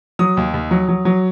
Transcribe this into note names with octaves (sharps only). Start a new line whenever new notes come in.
F#3 D#6
D#2
D#2
F#3
F#3
F#3